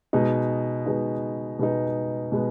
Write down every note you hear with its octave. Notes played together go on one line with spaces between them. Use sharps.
B2 G#3 B3 D#4
B2 G#3 B3 D#4
B2 G#3 B3 D#4
B2 G#3 B3